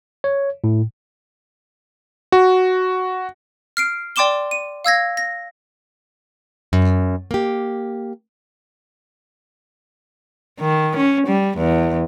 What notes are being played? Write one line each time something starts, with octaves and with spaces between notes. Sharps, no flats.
C#5
A2
F#4
F6 C7 D7
D5 G5 C6 D6 E7 G7
D#7
F5 E6 G#6 A#6
A#6
F#2
A#3 G4
D#3
C#4
G3
E2